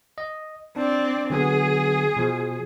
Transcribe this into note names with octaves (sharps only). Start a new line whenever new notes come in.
D#5
C4 D4 D5
D3 F#3 B3 G#4
B2 F3